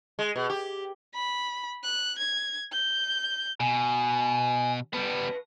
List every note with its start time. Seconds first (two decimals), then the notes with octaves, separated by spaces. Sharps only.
0.19 G#3
0.36 B2
0.50 G4
1.14 B5
1.83 F#6
2.18 G#6
2.72 G6
3.60 B2 G#5
4.93 G3 B3 B4 A5